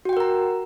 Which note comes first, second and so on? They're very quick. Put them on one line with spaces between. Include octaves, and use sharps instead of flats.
F#4 G5 F#5 A#4 A#5